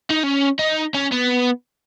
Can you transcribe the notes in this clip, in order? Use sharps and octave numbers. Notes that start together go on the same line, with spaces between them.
D#4
C#4
D#4
C#4
B3